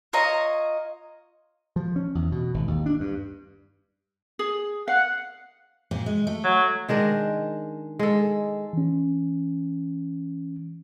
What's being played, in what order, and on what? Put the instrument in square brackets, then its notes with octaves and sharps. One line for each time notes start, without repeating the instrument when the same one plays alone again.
[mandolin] F4 C#5 D#5 A#5
[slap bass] F3
C#4
E2
B2
G#1
D#2
D4
G2
[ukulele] G#4
[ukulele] F5 [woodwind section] F#5
[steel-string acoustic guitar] A#2 C4
G#3
A3
[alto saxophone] F#3
[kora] D#3 G#3 D4 A#4
G#3 A4
[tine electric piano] E3 C#4